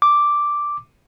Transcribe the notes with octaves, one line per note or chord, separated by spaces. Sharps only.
D6